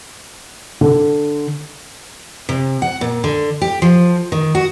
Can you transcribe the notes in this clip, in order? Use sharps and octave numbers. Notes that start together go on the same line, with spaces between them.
D3
C3
F#5
A#2
D3
G4
F3
D#3
F#4